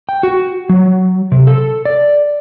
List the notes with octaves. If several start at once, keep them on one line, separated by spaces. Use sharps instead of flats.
G5
F#4
F#3
C3
A4
D5